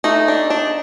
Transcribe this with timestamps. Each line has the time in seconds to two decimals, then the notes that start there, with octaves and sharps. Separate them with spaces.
0.04 A3 D#4
0.28 D4
0.50 D4